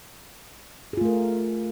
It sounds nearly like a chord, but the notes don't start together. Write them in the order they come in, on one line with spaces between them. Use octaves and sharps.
G#4 F4 A3 A#4